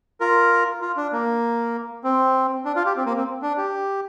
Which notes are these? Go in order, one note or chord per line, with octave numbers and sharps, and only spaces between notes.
F4 A#4
F4
D4
A#3
C4
D4
F4
G4
C4
A#3
C4
D4
G4